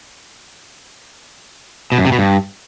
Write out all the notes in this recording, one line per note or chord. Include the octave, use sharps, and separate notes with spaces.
B2
F#2
C3
B2
G2